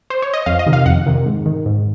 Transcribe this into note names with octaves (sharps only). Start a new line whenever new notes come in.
C5
C#5
D#5
F2 F5
D#5
C3 D#3
F5
F2 F#5
C3 D#3
G#2
D#3
G#2